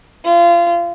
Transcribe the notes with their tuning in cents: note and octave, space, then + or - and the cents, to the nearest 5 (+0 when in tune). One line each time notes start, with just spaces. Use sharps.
F4 -30